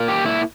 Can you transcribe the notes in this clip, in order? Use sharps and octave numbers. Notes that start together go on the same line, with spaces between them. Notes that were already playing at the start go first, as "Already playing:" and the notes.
Already playing: A#2 A#3
G4
E4